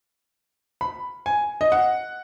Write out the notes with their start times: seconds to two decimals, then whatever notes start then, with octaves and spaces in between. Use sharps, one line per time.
0.81 B5
1.26 G#5
1.61 D#5
1.72 F#5